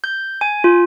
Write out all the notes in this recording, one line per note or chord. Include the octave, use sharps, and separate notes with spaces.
G6
G#5
F4